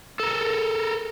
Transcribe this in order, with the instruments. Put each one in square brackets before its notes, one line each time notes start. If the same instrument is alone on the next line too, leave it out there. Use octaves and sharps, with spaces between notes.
[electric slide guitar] A4 A#4